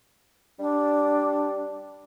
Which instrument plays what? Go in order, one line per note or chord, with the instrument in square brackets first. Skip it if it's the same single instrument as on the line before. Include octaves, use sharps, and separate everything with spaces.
[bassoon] G3 [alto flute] D4